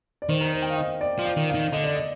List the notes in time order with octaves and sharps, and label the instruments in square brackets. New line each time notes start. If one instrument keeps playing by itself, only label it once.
[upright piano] D5
[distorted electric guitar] D#3 [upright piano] C5
[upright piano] A#4
C5
G5
F5
D#5
D5
[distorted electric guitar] F3
[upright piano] F5
[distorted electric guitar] D#3
[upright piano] F5
[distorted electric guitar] D#3
[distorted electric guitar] D3 [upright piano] D#5
[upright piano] D5
D#5